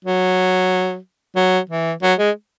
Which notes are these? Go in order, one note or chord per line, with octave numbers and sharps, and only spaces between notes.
F#3
F#3
E3
F#3
G#3